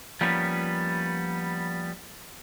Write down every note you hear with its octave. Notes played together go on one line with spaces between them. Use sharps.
F3 G3 A#3 B3 C#4